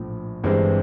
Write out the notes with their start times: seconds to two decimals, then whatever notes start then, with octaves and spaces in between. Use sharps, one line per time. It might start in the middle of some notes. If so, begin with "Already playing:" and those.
Already playing: A#1 A2 F3
0.44 G1 G2 E3 G#3 C4